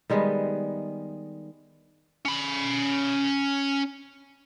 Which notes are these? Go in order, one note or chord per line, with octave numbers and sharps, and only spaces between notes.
D#3 G3 G#3 B3
C#4 B5